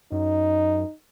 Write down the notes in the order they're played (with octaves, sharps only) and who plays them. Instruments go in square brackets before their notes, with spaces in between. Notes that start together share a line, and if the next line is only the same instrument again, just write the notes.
[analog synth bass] F#2 [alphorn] D#4